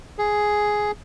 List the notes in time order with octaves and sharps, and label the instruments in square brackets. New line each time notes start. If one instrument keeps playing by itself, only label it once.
[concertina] G#4